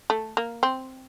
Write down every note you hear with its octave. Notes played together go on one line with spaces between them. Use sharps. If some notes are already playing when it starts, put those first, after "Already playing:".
A3
A#3
C4